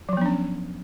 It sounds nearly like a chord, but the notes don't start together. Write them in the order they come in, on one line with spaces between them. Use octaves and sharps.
F#3 F3 B3 D4 C#4